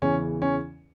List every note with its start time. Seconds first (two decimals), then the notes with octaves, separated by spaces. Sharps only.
0.02 E2 C#3 E3 C#4
0.42 C#4